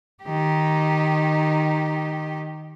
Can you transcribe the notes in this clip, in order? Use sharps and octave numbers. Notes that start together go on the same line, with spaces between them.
D#3 G4